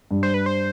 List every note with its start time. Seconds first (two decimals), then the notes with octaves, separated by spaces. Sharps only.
0.11 G2
0.23 C5
0.34 B4
0.46 C5